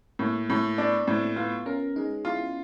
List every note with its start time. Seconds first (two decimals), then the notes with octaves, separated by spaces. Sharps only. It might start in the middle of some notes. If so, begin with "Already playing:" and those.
0.19 A2 A#3
0.49 A2 A3
0.78 B3 D4
1.08 A2 C4
1.36 B3 F4
1.66 C#4 A#4
1.96 G#3 D#4
2.25 E4 F4